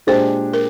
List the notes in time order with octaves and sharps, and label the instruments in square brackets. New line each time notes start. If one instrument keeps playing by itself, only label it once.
[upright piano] A#2 G#3 D4 G4 [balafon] C5
[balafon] A#4